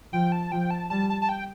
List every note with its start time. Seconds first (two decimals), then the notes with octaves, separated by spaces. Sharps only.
0.13 F3 G5
0.32 A5
0.52 F3 G5
0.71 A5
0.90 G3 A5
1.10 A5
1.22 A5
1.29 G5